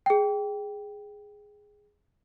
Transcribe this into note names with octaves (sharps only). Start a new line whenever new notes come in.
G#4 G5